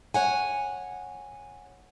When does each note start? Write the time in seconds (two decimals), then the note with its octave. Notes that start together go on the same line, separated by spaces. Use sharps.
0.14 C#5 F#5 G#5